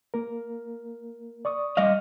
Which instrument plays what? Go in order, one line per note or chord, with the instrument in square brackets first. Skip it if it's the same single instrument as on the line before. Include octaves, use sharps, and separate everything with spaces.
[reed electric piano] A#3 A#4
D5 C#6 D#6
[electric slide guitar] G3 D#5 F5